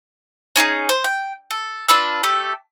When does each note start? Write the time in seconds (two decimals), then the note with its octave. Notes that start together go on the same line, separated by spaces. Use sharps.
0.56 C#4 D#4 F#4 G#4
0.89 C5
1.04 G5
1.51 A4
1.88 D4 F4 B4 E6
2.23 A3 G4 A4